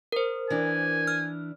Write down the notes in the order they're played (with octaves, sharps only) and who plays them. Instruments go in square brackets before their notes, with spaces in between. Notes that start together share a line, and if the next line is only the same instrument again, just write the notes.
[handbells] A#4 C5
[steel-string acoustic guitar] E3 D4 [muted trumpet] G#5
[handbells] F6